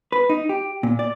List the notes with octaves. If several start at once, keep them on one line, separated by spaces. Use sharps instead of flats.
B4
D#4
G4
A#2
D5